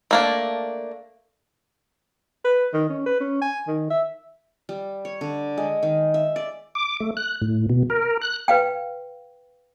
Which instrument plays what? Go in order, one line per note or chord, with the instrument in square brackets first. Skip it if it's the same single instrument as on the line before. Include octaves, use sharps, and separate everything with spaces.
[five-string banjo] A3 A#3 D4
[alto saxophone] B4
D#3
C#4
B4
C#4
G#5
D#3
E5
[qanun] G3
C#5
D3
G#3
D#3
E5
D5
[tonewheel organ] D6
A3
F#6
A2
B2
A#4
F#6
[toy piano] B4 F5 G5